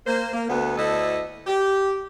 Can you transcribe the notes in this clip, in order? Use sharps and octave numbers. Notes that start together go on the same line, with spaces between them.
A#3 C5
A#3
D2 B3
D2 E4 A4 D#5
G4